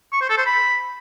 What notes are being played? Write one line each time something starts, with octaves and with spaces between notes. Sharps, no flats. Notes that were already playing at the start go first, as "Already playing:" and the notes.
C#6
C5
A4
C5
B5